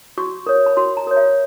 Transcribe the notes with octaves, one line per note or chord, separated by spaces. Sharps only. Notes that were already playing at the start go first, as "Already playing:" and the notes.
F#4 C#6
A#4 C#5
B5
F#4 C6
A#5
A#4 C#5
E5